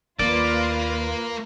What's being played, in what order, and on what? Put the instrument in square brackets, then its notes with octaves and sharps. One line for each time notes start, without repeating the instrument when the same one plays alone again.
[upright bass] D#2 [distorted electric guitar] A#3 [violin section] F4 B4 A#6 [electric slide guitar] D5